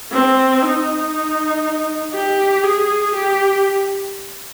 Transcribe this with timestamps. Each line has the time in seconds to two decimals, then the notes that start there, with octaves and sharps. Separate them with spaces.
0.12 C4
0.63 D#4
2.14 G4
2.63 G#4
3.14 G4